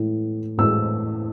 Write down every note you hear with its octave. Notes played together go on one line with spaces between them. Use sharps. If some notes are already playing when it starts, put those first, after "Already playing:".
Already playing: A2 E3 G#3
A2 E3 G#3 E6